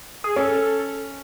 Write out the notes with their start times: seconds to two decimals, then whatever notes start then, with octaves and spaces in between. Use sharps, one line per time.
0.24 G#4
0.36 C#4 A4